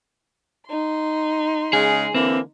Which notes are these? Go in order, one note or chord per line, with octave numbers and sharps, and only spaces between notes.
D#4 C6
C#3 G#3 G#4
D3 E3 A#3 C4